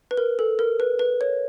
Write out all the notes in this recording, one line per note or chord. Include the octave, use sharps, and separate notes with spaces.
B4
A#4
A4
A#4
B4
B4
C#5